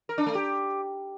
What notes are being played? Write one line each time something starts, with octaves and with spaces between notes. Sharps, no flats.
A#4
D4
A3
G4